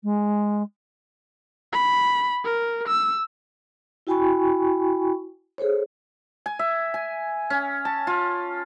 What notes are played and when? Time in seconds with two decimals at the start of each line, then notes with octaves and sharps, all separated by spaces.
0.04 G#3
1.73 B5
2.45 A#4
2.88 E6
4.07 E4 F#4 G5 G#5 B5 C#6
5.58 G#4 A4 C5 C#5
6.46 G#5
6.59 E5
6.94 G#5
7.50 C#4
7.85 A5
8.07 F4